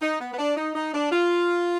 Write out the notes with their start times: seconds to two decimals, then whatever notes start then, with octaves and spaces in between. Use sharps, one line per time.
0.02 D#4
0.20 B3
0.33 B3
0.39 D4
0.57 D#4
0.76 D#4
0.94 D4
1.12 F4